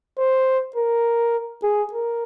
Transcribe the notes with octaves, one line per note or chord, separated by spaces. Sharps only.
C5
A#4
G#4
A#4